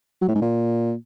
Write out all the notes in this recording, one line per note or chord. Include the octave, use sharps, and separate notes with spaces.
F#3
A2
G#2
A#2